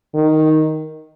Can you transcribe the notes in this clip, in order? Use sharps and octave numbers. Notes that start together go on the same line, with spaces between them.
D#3